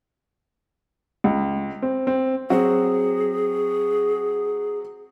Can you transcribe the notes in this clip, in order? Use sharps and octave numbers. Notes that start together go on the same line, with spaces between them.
C#2
C4
C4
F#3 C4 F#4 G#4